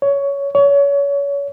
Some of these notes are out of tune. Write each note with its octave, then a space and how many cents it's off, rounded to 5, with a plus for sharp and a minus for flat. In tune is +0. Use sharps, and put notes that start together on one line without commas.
C#5 +15
C#5 +30